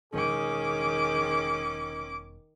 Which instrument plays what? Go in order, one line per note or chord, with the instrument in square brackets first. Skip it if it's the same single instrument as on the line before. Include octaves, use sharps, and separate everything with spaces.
[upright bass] E1 [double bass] D#3 [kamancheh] C#4 D6 [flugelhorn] G#4